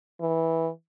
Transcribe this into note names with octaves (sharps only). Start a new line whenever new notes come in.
E3